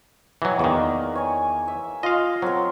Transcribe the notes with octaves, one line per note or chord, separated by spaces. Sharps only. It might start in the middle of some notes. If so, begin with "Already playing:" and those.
E3 F#3 D#5 G5
E2 D#3 A#3 D5
C#5 G#5
E5
F4 D#5 F5
F#3 C4 A#4